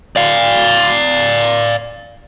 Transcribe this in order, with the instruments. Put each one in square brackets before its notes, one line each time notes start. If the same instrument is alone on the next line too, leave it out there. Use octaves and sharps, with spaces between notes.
[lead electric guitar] D5 F5